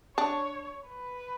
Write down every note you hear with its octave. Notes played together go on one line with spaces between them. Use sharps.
D4 C#5
B4